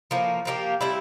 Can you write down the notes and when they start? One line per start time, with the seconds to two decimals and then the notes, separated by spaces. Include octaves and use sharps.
0.11 A2 F3 A#3
0.45 F3 A#3 E4 G4
0.81 A2 G3 C4 E4